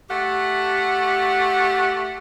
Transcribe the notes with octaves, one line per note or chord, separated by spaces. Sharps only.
A3 G4 F#5